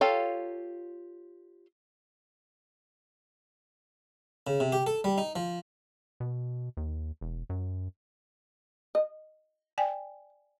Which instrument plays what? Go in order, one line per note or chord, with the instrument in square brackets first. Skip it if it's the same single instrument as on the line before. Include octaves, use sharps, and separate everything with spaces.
[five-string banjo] F4 G4 A4 C#5 F5
[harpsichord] C#3
C3
G4
A4
G3
D#4
F3
[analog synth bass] B2
D#2
E1
F#2
[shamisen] D#5
[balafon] D5 G5 G#5